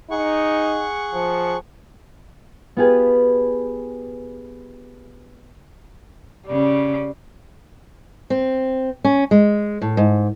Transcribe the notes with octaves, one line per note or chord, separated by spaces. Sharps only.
D#4 G#4 F#5 C#6
F3
B3 F4 G4 G#4 B4
C#3 G3
C4
C#4
G#3
A2
G#2